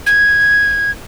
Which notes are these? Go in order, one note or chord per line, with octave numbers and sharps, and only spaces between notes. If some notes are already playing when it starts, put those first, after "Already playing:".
G#6